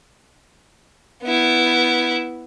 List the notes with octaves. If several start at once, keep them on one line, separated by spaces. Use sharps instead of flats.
B3 E4